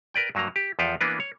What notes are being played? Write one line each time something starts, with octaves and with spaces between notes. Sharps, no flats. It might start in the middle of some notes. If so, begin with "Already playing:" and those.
A#4 B4 D5 G5
G2 F#3 A#3 A#5
G4
E2 F3 A4 B4 F5 G5
E3 A#3 B3 D4 B4
C#5